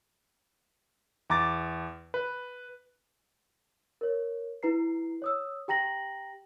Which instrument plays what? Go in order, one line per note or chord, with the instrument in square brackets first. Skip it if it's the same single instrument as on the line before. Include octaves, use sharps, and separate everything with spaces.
[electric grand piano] E2 A#5 D6 A6
B4
[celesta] A#4 C#5
E4 B4 A#5 C7
C#5 D#6 E6
G4 G5 A#5 A#6 F#7